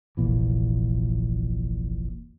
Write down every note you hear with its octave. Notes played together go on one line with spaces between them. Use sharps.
F1 A#1 A#2 E3